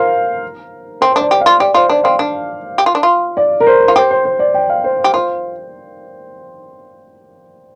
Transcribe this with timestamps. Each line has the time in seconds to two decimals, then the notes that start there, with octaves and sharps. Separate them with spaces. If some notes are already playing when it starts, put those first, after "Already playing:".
Already playing: F4 A#4 C5 F5
1.01 C4 C5
1.12 D4 C5
1.21 D5
1.31 G4
1.41 F5
1.46 F4
1.60 G4 D5
1.74 F4 C5
1.89 D4 D5
2.04 C4 F5
2.19 D4
2.78 G4
2.86 F4
2.95 D4
3.03 F4
3.37 D5
3.60 A#4
3.67 C5
3.88 F4
3.96 G4 C5
4.11 C5
4.25 C5
4.39 D5
4.54 G5
4.70 F5
4.84 C5
5.04 G4
5.13 F4 C5